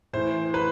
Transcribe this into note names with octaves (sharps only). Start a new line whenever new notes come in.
A2 E3 C5
B4